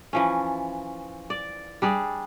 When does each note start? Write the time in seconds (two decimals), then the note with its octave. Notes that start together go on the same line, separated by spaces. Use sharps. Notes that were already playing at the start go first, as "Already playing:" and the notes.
0.13 E3 F3 C#4
1.30 D5
1.82 G3 D4 G#4